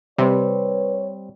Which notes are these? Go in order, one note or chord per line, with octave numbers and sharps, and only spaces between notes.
C3 G3 C4 B4 C#5